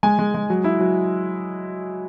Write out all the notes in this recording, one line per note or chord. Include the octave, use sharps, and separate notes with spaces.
G#3 G#5
G#3
G#3
F#3
E4
F#3